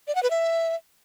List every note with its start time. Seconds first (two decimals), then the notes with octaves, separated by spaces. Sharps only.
0.08 D5
0.15 F#5
0.23 B4
0.30 E5